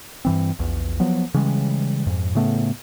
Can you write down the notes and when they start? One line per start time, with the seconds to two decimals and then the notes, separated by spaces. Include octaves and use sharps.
0.25 G2 E3 C4
0.59 A#1 E2
1.00 F3 F#3 B3
1.34 C#3 E3 G3 G#3
2.07 F2 G#2
2.35 A2 C#3 A3 B3